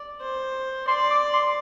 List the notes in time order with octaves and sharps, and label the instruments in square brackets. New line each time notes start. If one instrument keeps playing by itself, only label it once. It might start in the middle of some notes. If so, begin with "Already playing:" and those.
Already playing: [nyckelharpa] D5
C5
[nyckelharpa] D5 [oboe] C6
[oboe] D6
C6